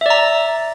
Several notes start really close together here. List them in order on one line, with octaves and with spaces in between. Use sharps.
E5 D5 A#5